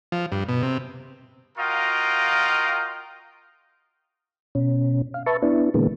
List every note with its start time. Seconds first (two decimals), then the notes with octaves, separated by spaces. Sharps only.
0.12 F3
0.32 G2
0.49 B2
0.63 C3
1.58 F4 F#4 A#4 D#5 F5 G5
4.55 B2 C#4
5.14 F5
5.26 B4 E5 A5 C#6
5.42 B3 D4 E4
5.74 A#2 D3 E3 G#3 A#3 B3